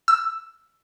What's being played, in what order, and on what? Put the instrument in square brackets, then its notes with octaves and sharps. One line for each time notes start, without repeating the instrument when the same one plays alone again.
[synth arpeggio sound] E6